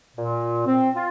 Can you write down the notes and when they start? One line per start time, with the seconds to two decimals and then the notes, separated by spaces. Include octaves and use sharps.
0.16 A#2
0.66 C4
0.94 F4